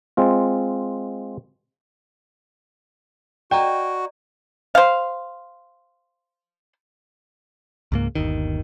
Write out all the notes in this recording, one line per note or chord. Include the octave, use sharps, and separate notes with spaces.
G#3 C4 F4
F#4 D5 D#5 G5 A#5
C5 F5
C#2 G#2 A#3
G1 D#2 D#3